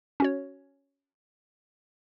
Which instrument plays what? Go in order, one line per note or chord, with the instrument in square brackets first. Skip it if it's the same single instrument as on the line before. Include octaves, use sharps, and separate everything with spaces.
[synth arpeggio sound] C#4 F#4 C#5